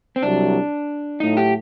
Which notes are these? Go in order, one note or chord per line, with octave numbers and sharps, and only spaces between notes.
C4
C2 C3 F#3 D4
A2 F#3 A3 D#4
G4